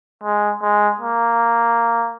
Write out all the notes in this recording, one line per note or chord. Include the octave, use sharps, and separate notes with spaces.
G#3
G#3
A#3